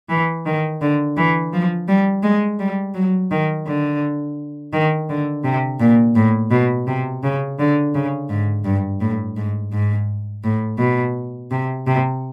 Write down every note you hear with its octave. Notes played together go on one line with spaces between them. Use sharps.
E3
D#3
D3
E3
F3
G3
G#3
G3
F#3
D#3
D3
D#3
D3
C3
A#2
A2
B2
C3
C#3
D3
C#3
G#2
G2
A2
G#2
G#2
A2
B2
C3
C3